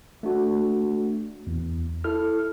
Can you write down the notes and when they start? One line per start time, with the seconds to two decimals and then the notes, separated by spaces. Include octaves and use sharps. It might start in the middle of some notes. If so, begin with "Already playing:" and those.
0.23 A3 D4 F#4
1.47 E2
2.04 E4 A4 F6